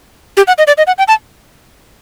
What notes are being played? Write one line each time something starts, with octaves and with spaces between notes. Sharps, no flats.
G4
F#5
D#5
D5
D#5
F#5
G5
A5